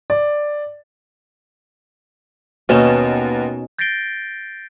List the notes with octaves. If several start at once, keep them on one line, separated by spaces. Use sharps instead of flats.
D5
D#2 B2 B3 C#4 D#4 E7
G6 A6 A#6 C7 D7 G7